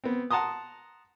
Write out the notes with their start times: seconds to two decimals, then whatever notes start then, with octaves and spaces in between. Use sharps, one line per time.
0.04 B3 C4
0.31 F#5 A5 A#5 C6 D#6